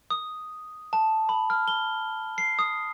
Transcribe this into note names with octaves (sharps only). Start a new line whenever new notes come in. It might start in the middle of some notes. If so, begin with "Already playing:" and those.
D#6
A5
B5
F6
G7
C7
D#6